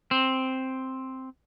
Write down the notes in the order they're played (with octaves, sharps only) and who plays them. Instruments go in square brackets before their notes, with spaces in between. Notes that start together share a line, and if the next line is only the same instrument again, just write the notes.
[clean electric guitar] C4